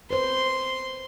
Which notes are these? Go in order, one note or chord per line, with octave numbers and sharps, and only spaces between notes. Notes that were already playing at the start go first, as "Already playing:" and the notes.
B4 C5 C6